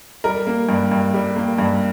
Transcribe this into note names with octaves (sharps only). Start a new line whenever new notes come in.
G3 A#4
A#3
G2
G2
G3
A#3
G2